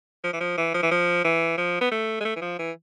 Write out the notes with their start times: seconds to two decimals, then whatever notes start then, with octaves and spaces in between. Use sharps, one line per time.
0.24 F3
0.33 E3
0.41 F3
0.57 E3
0.74 F3
0.83 E3
0.91 F3
1.24 E3
1.58 F3
1.81 B3
1.91 A3
2.20 G#3
2.25 A3
2.36 E3
2.41 F3
2.59 E3